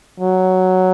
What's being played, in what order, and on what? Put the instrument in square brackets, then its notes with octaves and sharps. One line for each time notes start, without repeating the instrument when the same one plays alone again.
[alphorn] F#3